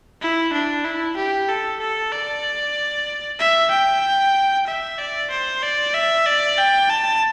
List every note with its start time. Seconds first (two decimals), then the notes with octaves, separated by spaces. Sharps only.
0.21 E4
0.53 D4
0.85 E4
1.17 G4
1.49 A4
1.80 A4
2.12 D5
3.39 E5
3.71 G5
4.67 E5
4.98 D5
5.31 C5
5.62 D5
5.94 E5
6.26 D5
6.58 G5
6.90 A5